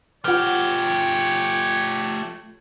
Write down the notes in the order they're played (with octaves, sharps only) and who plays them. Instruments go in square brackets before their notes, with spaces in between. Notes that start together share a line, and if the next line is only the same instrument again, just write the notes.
[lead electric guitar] A3 G4 [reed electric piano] F4 F6 [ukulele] B4 F#5 [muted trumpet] C#5